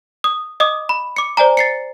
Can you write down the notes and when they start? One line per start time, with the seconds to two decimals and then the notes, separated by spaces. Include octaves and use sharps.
0.24 D#6
0.60 D#5 D6 D#6
0.89 B5
1.16 D6 C#7
1.37 C5 D5 G#5 A#5
1.57 A6 C7 C#7